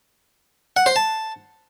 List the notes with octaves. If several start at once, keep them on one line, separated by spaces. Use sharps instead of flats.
F#5
C5
A5